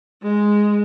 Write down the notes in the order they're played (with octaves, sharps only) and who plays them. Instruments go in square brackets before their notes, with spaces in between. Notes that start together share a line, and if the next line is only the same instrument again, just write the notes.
[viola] G#3